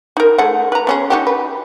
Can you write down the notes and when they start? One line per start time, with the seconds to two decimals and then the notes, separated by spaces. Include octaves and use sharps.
0.17 D#4 A#4
0.38 A3 G#4 F#5
0.72 B4 A#5
0.87 B3 C#4 G#4
1.10 D#4 F#4 G4
1.27 B4